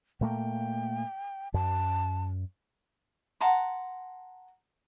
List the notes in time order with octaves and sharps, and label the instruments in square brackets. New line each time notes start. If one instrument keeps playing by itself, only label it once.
[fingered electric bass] A#2 A3 A#3 [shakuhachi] G5
[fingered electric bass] F#2 [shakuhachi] A5
[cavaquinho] F#5 A5 A#5 C6